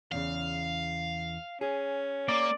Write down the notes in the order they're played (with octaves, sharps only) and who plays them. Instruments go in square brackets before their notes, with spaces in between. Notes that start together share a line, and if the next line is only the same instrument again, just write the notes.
[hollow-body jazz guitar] E2 A#2 C#3 [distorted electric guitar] F5
[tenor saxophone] C#4 [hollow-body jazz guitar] G#4
[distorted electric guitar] A#3 [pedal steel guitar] D5